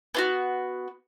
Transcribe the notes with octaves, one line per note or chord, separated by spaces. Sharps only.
B3 F4 F#4